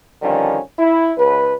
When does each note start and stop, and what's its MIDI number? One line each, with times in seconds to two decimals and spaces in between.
0.22 0.58 50
0.22 0.58 51
0.22 0.58 53
0.22 0.58 55
0.22 0.58 61
0.79 1.12 64
1.18 1.53 37
1.18 1.53 71